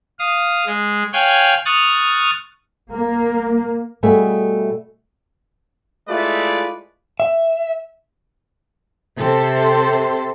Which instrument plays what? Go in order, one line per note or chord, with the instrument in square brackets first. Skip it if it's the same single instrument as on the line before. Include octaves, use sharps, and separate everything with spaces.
[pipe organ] F5 D#6
G#3
C#5 F5 G5 G#5 F#6
C#6 D#6 F6 F#6 A6
[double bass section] A#3
[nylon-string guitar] B2 G3 A3 G#4 D#5 E5
[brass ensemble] G#3 A3 E4 F4 B4 D5
[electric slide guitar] E5
[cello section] C3 A4 C5